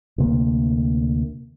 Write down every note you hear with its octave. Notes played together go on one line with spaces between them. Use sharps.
D2 C3 A#3